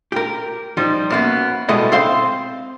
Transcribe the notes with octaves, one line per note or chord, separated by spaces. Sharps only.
G4 A#4
F3 G3 D#4
F#2 A#3 B3
B2 G3 G#3 E4 A4 D#5
C4 C5 F5 C6